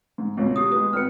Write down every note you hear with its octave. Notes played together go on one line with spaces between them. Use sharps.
G#2
C#2 B2
G4 D#6
G#3 B3 D#6
G#1 B4 F6 C#7